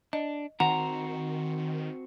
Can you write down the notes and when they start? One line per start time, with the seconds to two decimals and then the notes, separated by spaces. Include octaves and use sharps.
0.13 D4 D#5
0.60 D#3 C4 F#4 C5 F#5 A#5